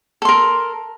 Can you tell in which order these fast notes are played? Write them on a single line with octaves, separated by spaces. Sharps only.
A4 C6 A#4